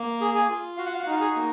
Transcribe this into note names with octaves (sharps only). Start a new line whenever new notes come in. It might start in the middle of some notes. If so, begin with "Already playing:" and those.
Already playing: A#3
G#4
G#4 G#5
F4
F#4 F5
F#5
F5
F#5
D#4 F4 F5
G#4 G#5
A#3